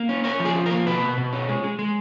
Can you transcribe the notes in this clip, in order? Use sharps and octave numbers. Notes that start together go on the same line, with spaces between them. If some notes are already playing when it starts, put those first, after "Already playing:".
Already playing: A#3
C#4
C#4 A#4
F3
G#4
F3
A#4
A#3
B2 B4
B2
B2
C#4
G#3
G#3
G#3